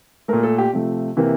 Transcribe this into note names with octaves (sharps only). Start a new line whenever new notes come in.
A#2 A3 A#4
A4
G4
C3 F3 A3
C3 E3 A#3